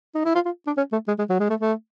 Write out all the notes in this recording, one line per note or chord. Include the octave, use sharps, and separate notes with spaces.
D#4
E4
F4
F4
D4
C#4
A3
G#3
G#3
F#3
G#3
A3
A3